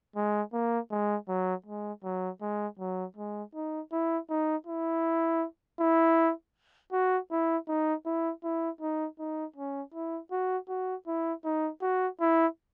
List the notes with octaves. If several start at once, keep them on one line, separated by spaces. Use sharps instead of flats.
G#3
A#3
G#3
F#3
G#3
F#3
G#3
F#3
G#3
D#4
E4
D#4
E4
E4
F#4
E4
D#4
E4
E4
D#4
D#4
C#4
E4
F#4
F#4
E4
D#4
F#4
E4